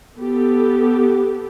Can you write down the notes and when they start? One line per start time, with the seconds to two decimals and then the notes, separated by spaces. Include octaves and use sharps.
0.16 B3 G4 A4